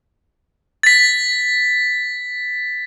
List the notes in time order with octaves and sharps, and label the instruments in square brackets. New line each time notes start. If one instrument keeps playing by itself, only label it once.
[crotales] A6 B6